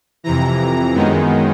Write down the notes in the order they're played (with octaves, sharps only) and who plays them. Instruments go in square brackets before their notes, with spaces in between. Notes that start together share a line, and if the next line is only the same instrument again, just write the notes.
[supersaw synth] F2 C3 E3 A#5
F#2 D#3 G#3 B3 D#4